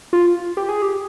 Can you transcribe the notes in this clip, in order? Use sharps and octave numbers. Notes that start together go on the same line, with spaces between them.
F4
G4
G#4
G4